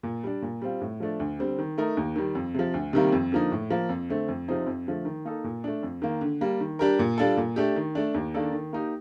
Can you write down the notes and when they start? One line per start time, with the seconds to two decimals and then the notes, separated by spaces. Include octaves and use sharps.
0.03 A#2
0.24 G3 D4
0.42 A#2
0.62 G3 C4 F4
0.81 A2
1.00 F3 A3 D4
1.20 D2
1.39 D3 G3 C4
1.59 D#3
1.78 A3 D#4 A#4
1.97 D#2
2.16 D#3 G3
2.35 F2
2.55 C3 F3
2.74 D2
2.93 C3 D#3 G3 A#3
3.12 F2
3.32 D3 F3 A#3 D#4
3.52 A2
3.70 F3 A#3
3.89 F2
4.09 D3 A3 C4
4.28 F2
4.48 C3 F3 C4 D#4
4.67 F2
4.87 D3 F3 A3
5.05 D#3
5.25 A#3 D#4 A4
5.44 A#2
5.64 A3 D4
5.83 F2
6.02 D#3 A#3
6.21 D3
6.41 G3 A#3
6.60 D#3
6.79 G3 D4 G4 A#4
6.99 A#2
7.18 G3 D4 F4 A4
7.37 A#2
7.56 A3 D4 G4
7.76 D#3
7.95 A3 D4
8.14 D#2
8.34 D#3 A#3 D4 A4
8.53 D#3
8.73 A#3 D#4 G4